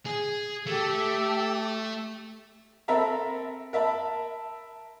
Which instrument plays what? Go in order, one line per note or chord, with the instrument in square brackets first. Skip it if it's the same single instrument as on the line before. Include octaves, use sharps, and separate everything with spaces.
[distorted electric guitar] G#4
[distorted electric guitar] A3 [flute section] G4 A4
[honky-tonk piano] C4 A4 A#4 E5 A#5 B5
A#4 E5 A5 B5